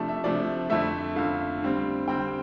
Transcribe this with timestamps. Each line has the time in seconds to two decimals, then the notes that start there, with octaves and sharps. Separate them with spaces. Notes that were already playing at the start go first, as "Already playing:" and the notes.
Already playing: C3 F3 A3 D4 A5
0.09 E5
0.24 C3 F3 A3 D4 D5
0.70 F2 D3 A3 E5
1.16 F2 D3 A3 F5
1.62 D3 G3 C4
2.08 D3 G3 C4 G5